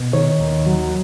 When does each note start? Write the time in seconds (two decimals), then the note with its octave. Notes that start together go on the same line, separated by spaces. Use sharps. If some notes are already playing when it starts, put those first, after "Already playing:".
Already playing: B2
0.13 D#3 C#5
0.40 D#2
0.66 F#3